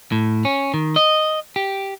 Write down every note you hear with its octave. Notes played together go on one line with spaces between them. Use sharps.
A2
C#4
D#3
D#5
G4